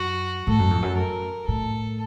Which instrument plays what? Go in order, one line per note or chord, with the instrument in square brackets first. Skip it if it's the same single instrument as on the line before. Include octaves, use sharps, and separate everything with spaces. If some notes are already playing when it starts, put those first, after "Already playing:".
Already playing: [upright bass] F#2 [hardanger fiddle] F#4
[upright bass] A2 [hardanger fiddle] A4
[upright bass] F#2
F2
F#2
[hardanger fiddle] A#4
[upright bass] A2 [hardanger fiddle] A4